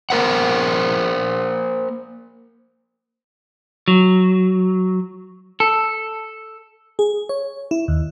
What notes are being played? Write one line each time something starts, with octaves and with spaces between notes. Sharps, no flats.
A#3 A#4 C5 F#5
F#3
A4
G#4
C#5
E4
D#2